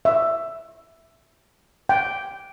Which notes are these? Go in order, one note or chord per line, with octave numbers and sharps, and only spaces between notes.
E5
G5